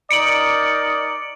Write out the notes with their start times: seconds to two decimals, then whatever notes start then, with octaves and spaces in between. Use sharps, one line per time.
0.11 D#4 A#4 D5 C#7 D7 F#7